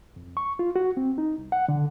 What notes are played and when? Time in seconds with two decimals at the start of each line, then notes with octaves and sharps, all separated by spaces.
0.16 F2
0.37 C#6
0.59 F4
0.76 F#4
0.97 C4
1.18 D#4
1.38 C2
1.52 F#5
1.68 D3